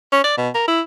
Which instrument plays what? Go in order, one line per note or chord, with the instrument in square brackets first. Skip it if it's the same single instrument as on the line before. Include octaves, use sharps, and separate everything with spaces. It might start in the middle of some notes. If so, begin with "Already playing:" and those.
[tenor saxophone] C#4
D5
B2
A#4
E4